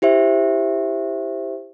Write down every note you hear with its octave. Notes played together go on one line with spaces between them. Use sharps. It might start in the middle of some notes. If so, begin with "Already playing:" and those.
E4 G4 C5 E5